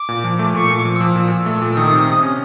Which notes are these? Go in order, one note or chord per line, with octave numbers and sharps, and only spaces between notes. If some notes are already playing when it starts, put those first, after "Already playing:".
Already playing: D6
A#2
F3
A3
A#2 C#6
A#2 D6
F3
F3 E6
A#2
A#2
A3
A#2
E6
D#3 D#6
C3
C3 D#6
C#4